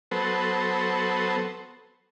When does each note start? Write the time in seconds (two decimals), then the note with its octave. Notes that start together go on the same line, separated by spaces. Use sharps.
0.11 F#3 B3 A4 C5